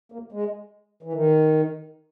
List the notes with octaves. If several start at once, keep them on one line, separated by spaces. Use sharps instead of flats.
A#3
G#3
E3
D#3